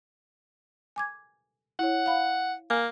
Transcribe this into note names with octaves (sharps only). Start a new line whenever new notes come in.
G#5 D6 G#6
E4 C#5 F#5
F5 B5
A#3 G#5